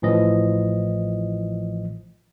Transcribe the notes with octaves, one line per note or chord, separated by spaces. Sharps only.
A1 A2 E3 F3 D#5